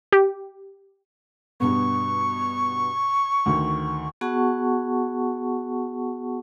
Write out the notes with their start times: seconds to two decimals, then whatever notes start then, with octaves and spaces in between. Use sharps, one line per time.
0.12 G4
1.60 G2 B2 B3 C#6
3.46 D2 D#3
4.21 B3 F#4 G#4 F#5 A5 C#6